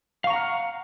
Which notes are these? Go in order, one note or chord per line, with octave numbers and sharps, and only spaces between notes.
F5 F#5 A#5 C#6 F6